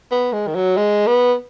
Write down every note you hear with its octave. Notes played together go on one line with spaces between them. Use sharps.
B3
G#3
D#3
F#3
G#3
B3